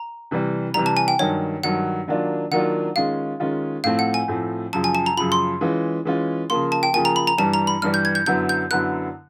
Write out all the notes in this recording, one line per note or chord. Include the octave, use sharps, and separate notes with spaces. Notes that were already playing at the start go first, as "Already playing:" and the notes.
Already playing: A#5
C3 E3 G3
C3 E3 G3 A#5
A5
G#5
G5
G2 D#3 F#3 C#5
G2 D#3 F#3 F#5
D#3 F#3 A#3 D4 F4
D#3 F#3 A#3 D4 F4 F#5
D#3 G#3 C#4 F4 F5
D#3 G#3 C#4 F4
A2 F3 A3 C4 F5
F#5
G#5
A2 F3 A3 C4
F#2 C#3 F3 A5
G#5
A5
A#5
F#2 C#3 F3 B5
C6
E3 G#3 C#4 F4
E3 G#3 C#4 F4
C#3 F3 A#3 C6
A5
G5
C#3 F3 A#3 G#5
A#5
B5
A#5
G2 E3 G3 A5
A#5
B5
G2 E3 G3 F6
G6
G#6
G6
F#2 D3 F#3 B3 E4 G6
G6
F#2 D3 F#3 B3 E4 F#6